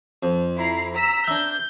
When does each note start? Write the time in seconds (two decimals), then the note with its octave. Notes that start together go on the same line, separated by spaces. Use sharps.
0.23 F2
0.56 E4 A#5 C7
0.93 A#5 E6 B6
1.27 D4 E5 G6